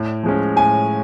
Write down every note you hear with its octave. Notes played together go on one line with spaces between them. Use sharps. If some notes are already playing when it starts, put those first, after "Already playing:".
Already playing: A2
F3 G#3 C#4
A2 G#5